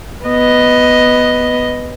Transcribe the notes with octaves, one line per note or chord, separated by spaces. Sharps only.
B3 D#5